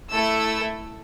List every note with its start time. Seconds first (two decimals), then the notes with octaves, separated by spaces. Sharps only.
0.11 A3 E4 A4 E6